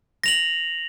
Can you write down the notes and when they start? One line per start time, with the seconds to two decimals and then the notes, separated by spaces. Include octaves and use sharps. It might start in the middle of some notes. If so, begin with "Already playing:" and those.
0.24 A#6 F7 F#7